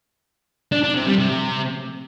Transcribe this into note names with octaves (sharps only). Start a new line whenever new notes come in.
D4
D4
C3
G3
C3